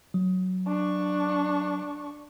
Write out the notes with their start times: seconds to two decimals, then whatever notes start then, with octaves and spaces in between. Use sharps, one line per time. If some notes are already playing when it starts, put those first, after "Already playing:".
0.14 F#3
0.67 D4 C#6